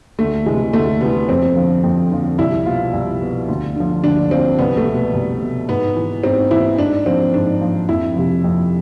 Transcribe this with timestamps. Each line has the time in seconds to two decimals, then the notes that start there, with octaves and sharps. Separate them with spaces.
0.19 D2 A3
0.46 C3 E3 G#3
0.73 D2 A3
1.01 C3 E3 B3
1.29 F2 C4
1.56 D3 F3
1.83 F2
2.11 D3 F3
2.38 C2 E4
2.66 B2 F4
2.93 C2
3.21 B2
3.48 D2
3.76 D3 F3
4.04 D2 D4
4.31 D3 F3 C4
4.59 C2 B3
4.77 A3
4.86 B2
4.95 B3
5.13 C2
5.41 B2
5.68 G#2 B3
5.96 E3
6.23 G#2 C4
6.51 E3 E4
6.78 G#2 D4
7.06 F3 C4
7.34 G#2 D4
7.61 F3
7.89 F2 E4
8.16 C3 F3
8.44 F2